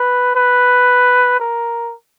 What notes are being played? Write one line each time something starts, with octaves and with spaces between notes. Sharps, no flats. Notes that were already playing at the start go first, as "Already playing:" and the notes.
Already playing: B4
B4
A#4